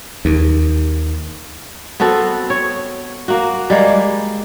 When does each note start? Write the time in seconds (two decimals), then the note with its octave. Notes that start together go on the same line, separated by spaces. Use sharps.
0.25 D#2
2.00 B3 C4 F#4 A4
2.50 C#5
3.28 A#3 F#4
3.70 G3 G#3 A#3